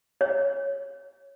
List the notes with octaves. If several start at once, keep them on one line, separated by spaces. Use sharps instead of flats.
C#5